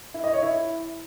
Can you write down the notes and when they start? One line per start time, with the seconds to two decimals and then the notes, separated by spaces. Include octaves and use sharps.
0.14 E4
0.24 D#5
0.33 C#5
0.43 E4